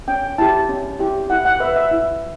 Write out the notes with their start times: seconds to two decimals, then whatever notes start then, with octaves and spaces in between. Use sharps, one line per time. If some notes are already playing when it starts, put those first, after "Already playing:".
0.08 C#4 G5
0.38 E4 G4 A5
0.69 C#4
0.99 E4 G4
1.30 E4 F#5
1.45 F#5
1.60 B4 E5
1.76 E5
1.91 E4